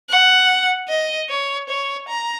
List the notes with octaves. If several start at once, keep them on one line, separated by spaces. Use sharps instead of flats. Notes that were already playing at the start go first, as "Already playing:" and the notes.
F#5
D#5
C#5
C#5
A#5